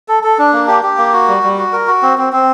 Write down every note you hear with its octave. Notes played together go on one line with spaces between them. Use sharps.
A4
A4
D4
A#3
G4
G4
A#3
F#4
G3
G3
F#4
A#4
F#4
C4
C4
C4